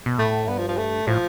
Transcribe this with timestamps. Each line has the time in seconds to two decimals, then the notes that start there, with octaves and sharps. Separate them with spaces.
0.06 B2
0.18 A2 A3
0.47 G2 B3
0.58 F3
0.68 F3
0.77 A3
1.07 A2 F3